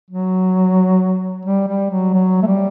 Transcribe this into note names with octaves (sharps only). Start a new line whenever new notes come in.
F#3
G3
G3
F#3
F#3
A3
G3